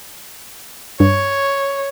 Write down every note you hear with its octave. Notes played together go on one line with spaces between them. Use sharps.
G2 C#5